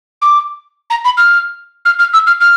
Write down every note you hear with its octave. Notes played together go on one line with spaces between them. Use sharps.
D6
A#5
B5
F6
F6
F6
E6
F6
F6